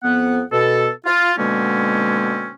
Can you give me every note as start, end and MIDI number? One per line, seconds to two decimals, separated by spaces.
0.03 0.42 41
0.03 0.42 59
0.03 0.42 78
0.52 0.89 47
0.52 0.89 69
1.06 1.33 65
1.38 2.52 47
1.38 2.52 50
1.38 2.52 56
1.38 2.52 58
1.38 2.52 60
1.38 2.52 61